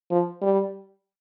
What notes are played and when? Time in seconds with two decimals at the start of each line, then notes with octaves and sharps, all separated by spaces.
0.11 F3
0.42 G3